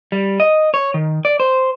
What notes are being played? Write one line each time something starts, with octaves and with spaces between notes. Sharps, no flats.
G3
D#5
C#5
D#3
D5
C5